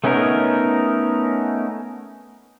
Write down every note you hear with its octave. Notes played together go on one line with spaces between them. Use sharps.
A3 B3 C#4 D#4 A#4